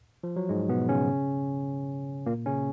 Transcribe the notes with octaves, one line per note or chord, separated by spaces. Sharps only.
F3
F#3
G#2 G#3
B2 B3
C#3 C#4
A#2 A#3
C#3 C#4